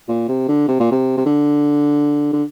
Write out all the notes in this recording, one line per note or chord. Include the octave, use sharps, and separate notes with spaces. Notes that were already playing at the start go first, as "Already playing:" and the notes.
A#2
C3
D3
C3
A#2
C3
C3
D3
D3